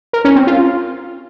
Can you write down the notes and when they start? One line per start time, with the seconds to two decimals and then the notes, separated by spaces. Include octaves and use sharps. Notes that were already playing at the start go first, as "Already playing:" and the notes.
0.13 A#4
0.25 C#4
0.36 C4
0.47 F4